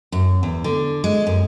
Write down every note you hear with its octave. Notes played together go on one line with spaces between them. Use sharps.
F#2
E2
D3
G#3
F#2